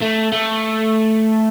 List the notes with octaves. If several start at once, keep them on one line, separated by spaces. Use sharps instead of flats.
A3
A3